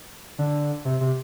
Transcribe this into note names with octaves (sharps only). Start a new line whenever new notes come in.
D3
C3
C3